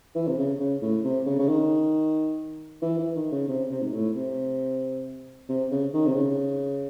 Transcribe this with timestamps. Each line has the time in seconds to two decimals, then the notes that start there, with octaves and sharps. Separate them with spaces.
0.15 E3
0.27 C3
0.38 C#3
0.60 C#3
0.82 A2
1.04 C3
1.26 C#3
1.39 C#3
1.49 D#3
2.82 E3
2.98 E3
3.16 D#3
3.32 C#3
3.48 C3
3.71 C3
3.82 G#2
3.93 A2
4.16 C3
5.49 C3
5.71 C#3
5.93 D#3
6.07 C3
6.15 C#3